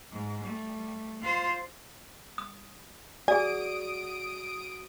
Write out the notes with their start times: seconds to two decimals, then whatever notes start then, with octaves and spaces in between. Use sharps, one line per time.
0.11 G#2
0.44 G3 A3
1.21 F4 C5
2.38 D#6
3.28 F#4 G#4 D5 G#5 D#6 D7